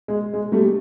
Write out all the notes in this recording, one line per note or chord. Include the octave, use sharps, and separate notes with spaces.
G#3
G#3
G3 A3